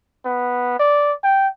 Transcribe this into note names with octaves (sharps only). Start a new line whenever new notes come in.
B3
D5
G5